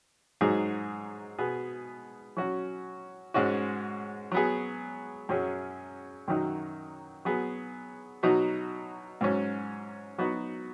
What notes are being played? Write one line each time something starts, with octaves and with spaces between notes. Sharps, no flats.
G#2 F#3 D#4 G#4
B2 B3 G#4
F#3 C#4 F#4
G#2 G#3 C#4 F#4
F#3 B3 G#4
F#2 F#3 C#4 G#4
F#2 D#3 F#3 D#4
F#3 B3 G#4
B2 F#3 D#4
G#2 F#3 C#4
F#3 B3 D#4 F#4